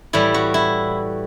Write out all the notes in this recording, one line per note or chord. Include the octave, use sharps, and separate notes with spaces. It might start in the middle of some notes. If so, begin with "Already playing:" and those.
A2 E3 G3 E4
F#4
E4